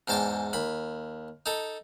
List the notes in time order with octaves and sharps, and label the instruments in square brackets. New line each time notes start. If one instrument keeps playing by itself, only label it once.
[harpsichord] E2 G#2 G5 A5 C6 D6
D#2 B5
D#4 A4